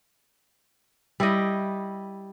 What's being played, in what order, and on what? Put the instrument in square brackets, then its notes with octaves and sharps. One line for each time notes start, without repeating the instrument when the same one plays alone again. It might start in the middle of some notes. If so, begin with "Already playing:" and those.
[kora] G3 E4 G4 D#5